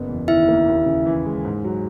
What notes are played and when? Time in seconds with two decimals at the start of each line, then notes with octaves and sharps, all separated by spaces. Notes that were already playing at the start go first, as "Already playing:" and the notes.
Already playing: F#1 B3
0.09 E2
0.28 D#3 E4 E5
0.48 A#3
0.68 D#2
0.86 C#3
1.06 E3
1.26 G#3
1.45 G#2
1.64 F#3